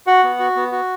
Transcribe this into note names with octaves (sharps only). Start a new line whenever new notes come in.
F#4 F#5
B3
F#4
B3
F#4